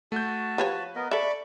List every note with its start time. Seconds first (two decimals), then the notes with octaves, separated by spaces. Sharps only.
0.12 A3 F#4 A5 G6
0.58 F3 G4 B4 C#5
0.96 B3 A#4 D#5
1.11 A4 D5 E5 B5 C#6 D6